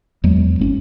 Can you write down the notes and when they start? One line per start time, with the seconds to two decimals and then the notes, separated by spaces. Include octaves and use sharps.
0.24 E2 F#3 G#3
0.59 G#1 C4 C#4